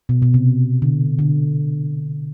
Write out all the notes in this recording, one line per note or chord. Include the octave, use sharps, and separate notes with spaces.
B2
B2
C3
D3
D3